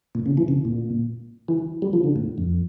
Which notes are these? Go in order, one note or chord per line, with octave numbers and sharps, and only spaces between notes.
A#2
C#3
E3
C#3
A#2
E3
G3
F3
D3
A2
F2